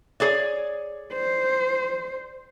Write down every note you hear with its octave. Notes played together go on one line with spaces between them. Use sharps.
G#4 C#5 D5
C5